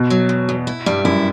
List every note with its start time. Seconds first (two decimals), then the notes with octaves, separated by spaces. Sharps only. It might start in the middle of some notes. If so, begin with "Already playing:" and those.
Already playing: B2
0.10 F#3
0.29 E2
0.49 E2
0.67 E4
0.86 G2 G3
1.05 F#2 E4